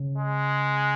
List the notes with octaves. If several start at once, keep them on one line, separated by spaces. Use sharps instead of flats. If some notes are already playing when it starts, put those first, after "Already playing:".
Already playing: C#3
G#3